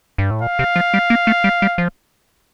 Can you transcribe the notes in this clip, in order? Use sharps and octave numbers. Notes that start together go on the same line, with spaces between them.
G2
A2
A#2 F5
C3
F3
G3
A#3
A3
G3
G3
F3